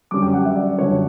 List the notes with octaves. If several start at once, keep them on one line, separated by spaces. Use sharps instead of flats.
F#2 D3 G3 C#4 D6
G5
F#5
E5
D5
F#2 D3 G3 C#4 C#5